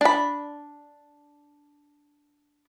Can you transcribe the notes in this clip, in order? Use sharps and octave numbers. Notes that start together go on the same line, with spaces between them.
D4 B5